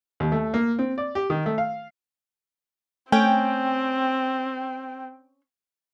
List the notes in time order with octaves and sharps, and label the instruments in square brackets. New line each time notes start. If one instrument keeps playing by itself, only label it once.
[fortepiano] D#2
A3
A#3
C4
D5
G4
D#3
A3
F5
[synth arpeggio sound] A3 [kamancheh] C4 [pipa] C#4 [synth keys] G5